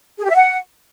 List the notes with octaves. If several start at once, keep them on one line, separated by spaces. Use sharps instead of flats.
G#4
G4
E5
F#5